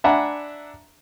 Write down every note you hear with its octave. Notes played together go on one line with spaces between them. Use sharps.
D4 E5 F#5 G#5 A#5 B5